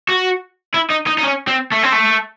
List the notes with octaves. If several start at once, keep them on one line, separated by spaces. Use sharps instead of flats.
F#4
E4
D#4
D#4
D#4
C#4
C4
A3
C4
A3